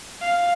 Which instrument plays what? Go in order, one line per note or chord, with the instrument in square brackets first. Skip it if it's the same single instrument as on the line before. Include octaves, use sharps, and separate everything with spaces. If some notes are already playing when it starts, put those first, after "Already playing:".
[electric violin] F5